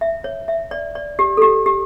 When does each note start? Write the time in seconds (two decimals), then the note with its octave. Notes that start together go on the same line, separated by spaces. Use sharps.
0.01 E5
0.24 C#5
0.48 E5
0.71 D5
0.95 D5
1.19 G4
1.37 A4
1.42 G4
1.66 G4